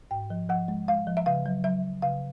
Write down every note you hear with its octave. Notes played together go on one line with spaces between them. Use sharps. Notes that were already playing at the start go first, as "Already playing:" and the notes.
G#2 G5
F3
F3 F#5
G#3
G#3 F5
F3
E5
C#3 F5
F#3
F#3 E5
F#3
C#3 F5